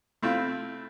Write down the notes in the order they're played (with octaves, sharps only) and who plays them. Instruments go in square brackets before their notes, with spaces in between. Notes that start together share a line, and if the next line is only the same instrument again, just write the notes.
[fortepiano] A3 C4 E4 F4